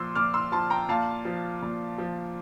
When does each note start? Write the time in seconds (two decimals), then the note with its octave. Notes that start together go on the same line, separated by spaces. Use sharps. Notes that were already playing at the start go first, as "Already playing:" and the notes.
Already playing: A#2 F3 C6 E6
0.15 A#2 D6 F6
0.34 C6 E6
0.52 F3 A5 C6
0.70 G5 A#5
0.89 A#2 F5 A5
1.25 F3
1.62 A#2
1.98 F3